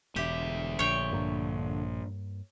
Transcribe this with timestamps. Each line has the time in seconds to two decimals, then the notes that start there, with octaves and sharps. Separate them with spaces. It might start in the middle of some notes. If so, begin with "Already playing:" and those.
0.16 E1 D3 G4 E5
0.79 A#1 C#5 G5
1.13 G2 A#3